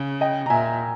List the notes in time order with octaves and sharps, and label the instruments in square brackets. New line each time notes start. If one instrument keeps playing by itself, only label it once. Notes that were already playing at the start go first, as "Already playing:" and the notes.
Already playing: [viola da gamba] C#3
[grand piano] D#5 G5
A#5
[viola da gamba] A#2 [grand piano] E5 G#5